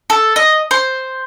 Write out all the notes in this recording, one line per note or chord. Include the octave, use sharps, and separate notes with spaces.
A4
D#5
C5